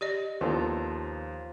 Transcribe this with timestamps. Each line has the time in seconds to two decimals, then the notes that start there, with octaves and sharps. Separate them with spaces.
0.01 G4 D5 D#5
0.41 D#2 F3 B3 D4 A4 A#5